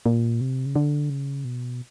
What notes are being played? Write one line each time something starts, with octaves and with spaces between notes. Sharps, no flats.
A#2
C3
C#3
D3
C#3
B2